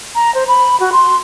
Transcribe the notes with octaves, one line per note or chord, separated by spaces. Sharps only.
A#5
C5
B5
F#4
C6